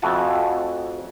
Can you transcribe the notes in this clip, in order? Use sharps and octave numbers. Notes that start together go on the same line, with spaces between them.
F2 A3 E4 F#4 G#5 A5